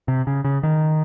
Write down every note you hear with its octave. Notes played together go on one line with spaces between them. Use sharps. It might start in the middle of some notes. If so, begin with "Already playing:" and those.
C3
C#3
C#3
D#3